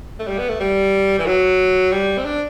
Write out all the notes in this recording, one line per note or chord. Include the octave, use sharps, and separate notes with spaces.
A3
G3
B3
A3
G3
E3
F#3
G3
C4
D4